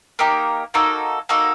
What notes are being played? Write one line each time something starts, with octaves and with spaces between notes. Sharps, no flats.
A#3 D#4 G4 A#4
A#3 D#4 F#4 A4
A#3 D#4 F#4 A4